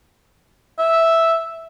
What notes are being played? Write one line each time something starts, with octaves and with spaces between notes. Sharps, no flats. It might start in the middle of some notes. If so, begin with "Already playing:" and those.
E5